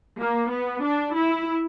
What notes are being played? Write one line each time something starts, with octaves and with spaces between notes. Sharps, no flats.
A#3
B3
D4
E4